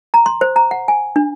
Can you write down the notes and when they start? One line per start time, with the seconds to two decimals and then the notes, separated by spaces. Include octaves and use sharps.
0.14 A#5
0.26 C6
0.41 C5
0.56 A#5
0.71 F#5
0.88 G#5
1.16 D4